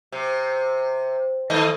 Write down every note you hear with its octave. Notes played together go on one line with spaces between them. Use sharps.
C3
D#3 A3 D#5